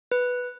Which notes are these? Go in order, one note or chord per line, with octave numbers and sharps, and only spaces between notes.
B4